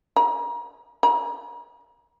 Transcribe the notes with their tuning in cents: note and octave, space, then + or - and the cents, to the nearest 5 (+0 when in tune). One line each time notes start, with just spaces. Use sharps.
A#5 +35
A#5 +40